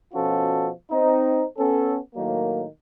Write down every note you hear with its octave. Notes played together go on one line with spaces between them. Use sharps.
B2 F3 C#4 F4 F#4 A4
C4 D#4
B3 C#4 A4
A2 D#3 F#3 A#3